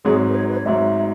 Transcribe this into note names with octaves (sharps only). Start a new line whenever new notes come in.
G#1 G#2 F#3 G#4
B4
C#5
B4
C#5
G#1 G#2 F#3 E5